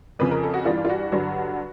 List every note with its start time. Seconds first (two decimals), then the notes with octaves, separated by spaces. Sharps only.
0.19 F2 C#3 F3 B4
0.31 A#4
0.43 A4
0.54 F#4
0.65 G2 E3 G3 F4
0.85 F4
0.89 F#4
1.12 G2 D3 F#3 F#4